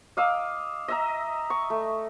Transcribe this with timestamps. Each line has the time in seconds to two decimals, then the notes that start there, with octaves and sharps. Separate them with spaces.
0.17 D#5 F5 D6 E6
0.88 D#5 E5 A#5
1.50 C#6
1.70 A3